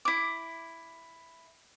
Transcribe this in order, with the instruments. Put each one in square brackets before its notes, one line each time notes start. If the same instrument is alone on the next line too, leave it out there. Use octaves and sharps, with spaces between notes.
[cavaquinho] E4 D6